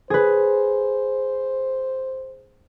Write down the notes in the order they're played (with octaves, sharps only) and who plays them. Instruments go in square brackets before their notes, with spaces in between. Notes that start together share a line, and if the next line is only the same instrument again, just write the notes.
[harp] G#4 B4 [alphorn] C5